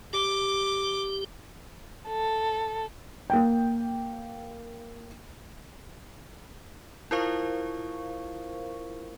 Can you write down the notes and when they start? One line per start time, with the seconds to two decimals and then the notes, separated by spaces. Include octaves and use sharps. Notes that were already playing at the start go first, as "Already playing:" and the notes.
0.13 G4 D6
2.08 A4
3.30 A#3 G5
7.11 E4 F4 A#4 C5 F5 C#6